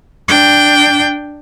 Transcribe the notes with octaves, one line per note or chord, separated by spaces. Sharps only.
D4 G5